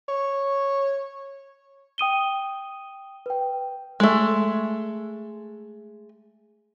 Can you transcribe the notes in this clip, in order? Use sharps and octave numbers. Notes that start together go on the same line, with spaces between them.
C#5
G5 D#6 D#7 G7
B4 G5
G#3 A3